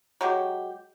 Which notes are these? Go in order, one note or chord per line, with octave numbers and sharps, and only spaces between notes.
F#3 G#3 G4